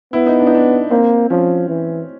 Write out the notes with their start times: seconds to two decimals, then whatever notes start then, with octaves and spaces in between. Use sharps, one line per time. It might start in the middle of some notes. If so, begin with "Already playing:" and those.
0.13 B3 E4
0.27 D#4
0.39 D4
0.47 D#4
0.55 D4
0.91 A#3 C4
1.30 F3 C#4
1.69 E3